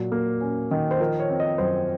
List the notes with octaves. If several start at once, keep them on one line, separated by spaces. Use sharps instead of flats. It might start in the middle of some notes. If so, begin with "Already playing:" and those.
Already playing: A#2 F#3
A#3
C#4
D#3
C5
F3 A#4
C#5
C4
D#5
F#2 C5